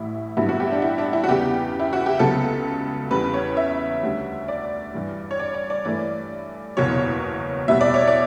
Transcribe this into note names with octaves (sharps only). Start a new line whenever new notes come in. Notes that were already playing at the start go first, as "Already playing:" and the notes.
Already playing: A1 A2 G3 E4
A1 G2 D3 F#3 B3 E4
F#4
G4
D4
E4
D4
E4
F#4
E2 C#3 G3 B3 G4
E4
F#4
G4
C#2 C#3 F#3 B3 A4
E2 C#3 G3 B4
C#5
E5
D2 D3 G3
D5
G2 E3 G3
C#5
D5
D5
D5
G2 E3 A3 D5
F#1 E2 B2 G3 C#5
E2 B2 G3 B3 E5
D5
C#5
D5